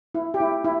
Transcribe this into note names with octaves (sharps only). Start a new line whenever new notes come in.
E4
G4
E4
E4